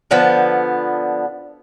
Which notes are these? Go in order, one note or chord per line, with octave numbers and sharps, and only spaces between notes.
D3 F3 B3